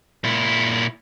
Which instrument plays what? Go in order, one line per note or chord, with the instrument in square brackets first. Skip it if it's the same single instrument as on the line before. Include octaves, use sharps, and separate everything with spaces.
[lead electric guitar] A#2 E4